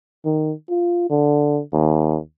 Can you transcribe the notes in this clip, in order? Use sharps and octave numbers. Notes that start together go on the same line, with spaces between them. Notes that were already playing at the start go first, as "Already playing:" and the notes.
D#3
F4
D3
D#2